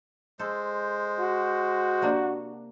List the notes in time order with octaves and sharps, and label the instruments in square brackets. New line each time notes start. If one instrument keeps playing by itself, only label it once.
[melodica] G#3 C5 [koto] A4
[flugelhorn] F#4
[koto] C3 A#3 D4